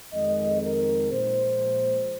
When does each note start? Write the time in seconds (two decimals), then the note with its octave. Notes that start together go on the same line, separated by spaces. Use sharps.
0.13 F2 D#3 G#3 D#5
0.62 A#4
1.11 A#2 F3 G#3 C5